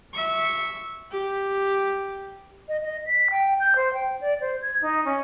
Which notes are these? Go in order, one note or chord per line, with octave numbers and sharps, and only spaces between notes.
E5 C#6
G4
D#5
D#5
B6
G5
G6
C5
G5
D5
C5
G#6
D#4
C#4